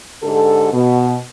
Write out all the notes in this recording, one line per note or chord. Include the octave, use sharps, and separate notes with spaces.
G#2 D3 G4 A4
B2